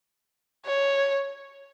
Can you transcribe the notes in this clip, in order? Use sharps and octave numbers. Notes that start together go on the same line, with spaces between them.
C#5